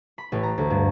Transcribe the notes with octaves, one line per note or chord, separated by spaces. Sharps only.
B5
A1
A#5
D2
G2